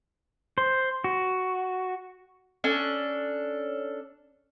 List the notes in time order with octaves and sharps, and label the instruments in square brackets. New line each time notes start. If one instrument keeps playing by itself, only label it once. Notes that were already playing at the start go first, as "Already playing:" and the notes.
[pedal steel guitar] C5
F#4
[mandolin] C#4 D4 A4